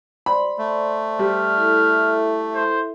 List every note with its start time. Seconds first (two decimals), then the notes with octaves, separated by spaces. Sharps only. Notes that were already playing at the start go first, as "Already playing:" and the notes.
0.26 C5 D5 B5 C6
0.58 A3
1.19 G3 F6
1.57 E4 A4 E5
2.55 C5